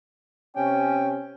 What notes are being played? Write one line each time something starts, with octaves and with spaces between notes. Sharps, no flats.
C3 C#4 G5